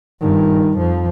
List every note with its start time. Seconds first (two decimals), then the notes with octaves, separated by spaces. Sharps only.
0.21 G2 D#3
0.78 F2 F3